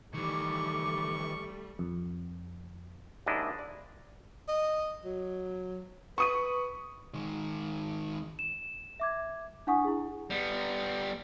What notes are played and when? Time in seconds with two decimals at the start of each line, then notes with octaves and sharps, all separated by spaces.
0.14 D#3 E3 G3 A3 C#6 D6
1.79 F2
3.26 D#2 G#2 D4 E4 D#5
3.59 D5
4.48 D#5
5.05 F#3
6.18 B4 C#6 D#6 D#7
7.14 D#3 G#3
8.39 E7
9.00 E5 D6 G#6
9.67 D4 E4 F#5 G#5 C#6 D#6
9.85 E4 G#4
10.30 G3 B3